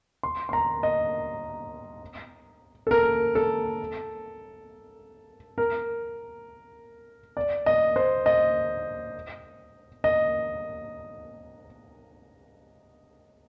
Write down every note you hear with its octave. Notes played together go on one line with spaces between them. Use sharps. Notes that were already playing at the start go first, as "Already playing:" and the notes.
C6
C6
A#5
D#5
A4
A#4
A4
A#4
D5
D#5
C5
D#5
D#5